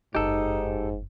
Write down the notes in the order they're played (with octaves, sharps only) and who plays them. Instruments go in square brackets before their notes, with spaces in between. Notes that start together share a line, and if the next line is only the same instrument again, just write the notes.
[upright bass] F#1 F2 [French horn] G#2 [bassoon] D#4 [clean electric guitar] G4 A4